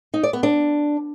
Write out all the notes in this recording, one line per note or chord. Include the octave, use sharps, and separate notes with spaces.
D#4
D5
B3
D4